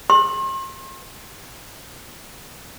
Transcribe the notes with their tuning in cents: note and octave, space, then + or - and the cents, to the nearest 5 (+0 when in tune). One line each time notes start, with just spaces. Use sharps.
C6 +40